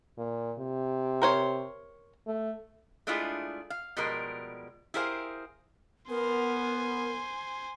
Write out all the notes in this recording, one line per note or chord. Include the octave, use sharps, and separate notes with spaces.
A#2
C3
A#4 C5 C#5
A3
G#3 A3 D4 E4 F4 G#4
F5
B2 F3 G3 G#3 A#4
E4 G4 G#4 A#4 C5 F5
B3 A#4 C5 G#5